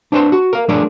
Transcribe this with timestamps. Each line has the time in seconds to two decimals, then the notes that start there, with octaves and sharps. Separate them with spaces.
0.12 D4 B4 C5 F#5 A5 C6
0.32 F#4
0.53 A#4 F5
0.68 F3 A3 D4 G#4 A#4 D5